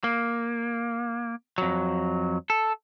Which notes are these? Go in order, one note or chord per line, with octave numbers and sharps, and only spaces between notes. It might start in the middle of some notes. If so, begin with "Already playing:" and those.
A#3
F2 F#3
A4